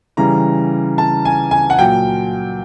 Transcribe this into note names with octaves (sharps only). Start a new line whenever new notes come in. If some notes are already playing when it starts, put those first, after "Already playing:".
C#3 E3 G3 A#5
A5
G#5
G#5
F#5
A#2 F#3 G5